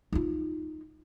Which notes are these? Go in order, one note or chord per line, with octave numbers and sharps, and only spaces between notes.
D#4 F4